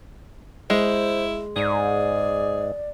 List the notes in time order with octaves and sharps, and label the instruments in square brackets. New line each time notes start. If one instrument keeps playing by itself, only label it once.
[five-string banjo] G#3 [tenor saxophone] E4 [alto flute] C5
[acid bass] G#2 [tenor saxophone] G#4 [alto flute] D5